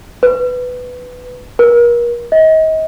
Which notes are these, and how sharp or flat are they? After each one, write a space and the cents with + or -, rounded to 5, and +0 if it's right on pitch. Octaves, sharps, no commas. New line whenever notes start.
B4 +10
A#4 +35
D#5 +30